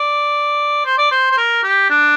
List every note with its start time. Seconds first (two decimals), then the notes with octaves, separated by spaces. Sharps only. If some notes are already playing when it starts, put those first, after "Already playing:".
Already playing: D5
0.85 C5
0.98 D5
1.11 C5
1.31 C5
1.37 A#4
1.63 G4
1.90 D4